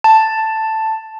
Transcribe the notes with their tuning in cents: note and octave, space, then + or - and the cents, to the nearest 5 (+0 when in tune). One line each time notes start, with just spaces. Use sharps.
A5 +5